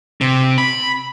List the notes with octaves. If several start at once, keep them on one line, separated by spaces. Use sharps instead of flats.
C3
B5